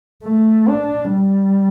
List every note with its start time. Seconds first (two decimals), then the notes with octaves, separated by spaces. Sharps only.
0.24 A3
0.68 D4
1.13 G3